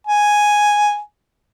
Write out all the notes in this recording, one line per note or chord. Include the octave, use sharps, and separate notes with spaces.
G#5